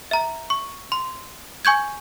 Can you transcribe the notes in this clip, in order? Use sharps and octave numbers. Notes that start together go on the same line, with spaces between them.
E5 A#5
C#6
C6
G#5 C#6 G6 G#6